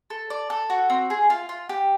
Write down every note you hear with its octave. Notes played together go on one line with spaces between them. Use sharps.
A4
D5
A4
F#4
C4
G#4
F4
F4
G4